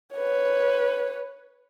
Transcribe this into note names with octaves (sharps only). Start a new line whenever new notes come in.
B4 C#5